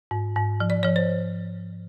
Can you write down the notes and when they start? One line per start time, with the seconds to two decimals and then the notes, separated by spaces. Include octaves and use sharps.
0.11 G#2
0.36 G#2
0.60 F3
0.70 D5
0.83 F3 C#5
0.96 C5